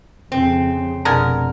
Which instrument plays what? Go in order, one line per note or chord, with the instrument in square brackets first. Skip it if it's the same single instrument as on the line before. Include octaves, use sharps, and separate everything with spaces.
[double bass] F2 C#3 [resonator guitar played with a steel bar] C4
[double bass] F1 B2 [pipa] D3 G#3 A#4